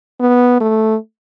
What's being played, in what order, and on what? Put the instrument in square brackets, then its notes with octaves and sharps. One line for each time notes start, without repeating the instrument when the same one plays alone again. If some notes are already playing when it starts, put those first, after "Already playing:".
[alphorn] B3
A3